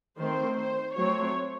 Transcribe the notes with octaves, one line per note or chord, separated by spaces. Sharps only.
D#3 A3 C4 C5
C5
F#3 A3 C4 C#5